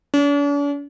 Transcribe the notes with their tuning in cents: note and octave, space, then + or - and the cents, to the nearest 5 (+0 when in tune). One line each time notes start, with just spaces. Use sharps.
D4 -45